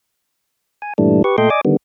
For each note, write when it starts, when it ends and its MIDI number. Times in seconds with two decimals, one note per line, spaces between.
0.82 0.93 80
0.98 1.22 43
0.98 1.22 46
0.98 1.22 52
0.98 1.22 55
0.98 1.22 57
0.98 1.22 62
1.24 1.36 67
1.24 1.36 71
1.24 1.36 85
1.38 1.50 46
1.38 1.50 57
1.38 1.50 69
1.38 1.50 75
1.38 1.50 79
1.38 1.50 84
1.50 1.61 74
1.50 1.61 75
1.50 1.61 80
1.50 1.61 86
1.65 1.77 50
1.65 1.77 51
1.65 1.77 55
1.65 1.77 59